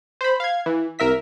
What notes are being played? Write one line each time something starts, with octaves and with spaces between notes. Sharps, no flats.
C5 B5
F5 G#6
E3
C2 A#4 E5 B6